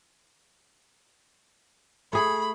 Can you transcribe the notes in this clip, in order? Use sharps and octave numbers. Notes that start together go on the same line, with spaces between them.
A3 G#4 B5